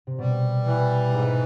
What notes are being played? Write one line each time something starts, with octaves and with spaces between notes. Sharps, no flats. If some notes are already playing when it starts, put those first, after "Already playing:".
C3
B2 G3
E3
G#2